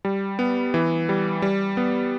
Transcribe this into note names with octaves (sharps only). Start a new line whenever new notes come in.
G3
B3
E3
G3
G3
B3